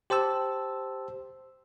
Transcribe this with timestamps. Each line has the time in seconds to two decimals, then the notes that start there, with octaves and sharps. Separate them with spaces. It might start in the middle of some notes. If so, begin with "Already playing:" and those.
0.10 G4 C5 A5 E6